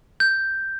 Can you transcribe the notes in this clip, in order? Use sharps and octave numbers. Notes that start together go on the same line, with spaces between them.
G6